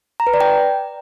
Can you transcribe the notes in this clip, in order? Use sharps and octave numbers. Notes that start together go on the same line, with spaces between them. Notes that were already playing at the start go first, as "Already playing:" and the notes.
A#5
B4
D5
G5